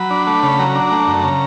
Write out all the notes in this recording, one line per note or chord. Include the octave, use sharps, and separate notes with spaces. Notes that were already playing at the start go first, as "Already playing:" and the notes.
Already playing: F#3 B5
D4
A3
C#3
F#3 A#5
D4
A3
F#2
C#3